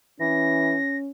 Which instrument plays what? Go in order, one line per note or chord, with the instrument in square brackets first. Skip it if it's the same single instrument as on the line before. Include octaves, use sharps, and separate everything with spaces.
[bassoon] E3 [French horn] C#4 [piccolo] A#6